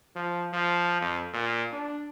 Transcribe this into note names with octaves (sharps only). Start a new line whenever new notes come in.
F3
F3
F2
A#2
D4